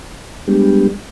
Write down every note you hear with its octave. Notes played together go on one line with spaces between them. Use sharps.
G3 G#3 B3 D4 G4